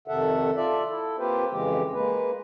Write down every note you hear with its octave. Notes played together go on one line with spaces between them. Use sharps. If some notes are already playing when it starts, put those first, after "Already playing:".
F2 C3 D#3 A4 E5 F#5
F4 A4 D5 E5
E4 A4
A#3 C4 F4 G4 B4 C5
F2 C#3 E3 G#3 G4
G#3 A#3 B4